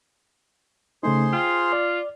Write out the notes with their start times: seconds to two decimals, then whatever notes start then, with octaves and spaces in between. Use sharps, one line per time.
1.03 C#3 A3 D#4 G#4 C5 C6
1.33 F4 G5
1.73 D5